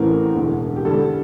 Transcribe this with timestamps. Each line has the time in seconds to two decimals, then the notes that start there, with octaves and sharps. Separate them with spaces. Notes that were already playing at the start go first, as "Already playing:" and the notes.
Already playing: A1 A2 E3 A3 C4 A#4
0.35 E1 D2 D3
0.76 G4
0.85 G2 D3 G3 A4